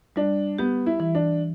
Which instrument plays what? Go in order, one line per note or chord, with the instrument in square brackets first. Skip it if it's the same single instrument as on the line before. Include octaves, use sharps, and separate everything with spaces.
[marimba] G3 [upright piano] D4
[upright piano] B3 [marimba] G4
[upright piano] E4
[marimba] E3
[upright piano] D4